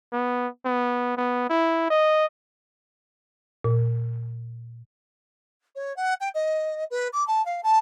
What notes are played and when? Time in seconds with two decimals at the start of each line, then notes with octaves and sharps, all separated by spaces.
0.12 B3
0.65 B3
1.17 B3
1.50 E4
1.90 D#5
3.64 A#2
5.75 C#5
5.96 F#5
6.20 G5
6.34 D#5
6.90 B4
7.13 D6
7.27 A5
7.45 F5
7.63 A5